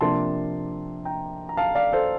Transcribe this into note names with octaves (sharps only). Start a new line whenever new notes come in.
C3 F3 A#3 D4 A5 C6
G5 A#5
A#5
F5 A5
D5 F5
A4 C5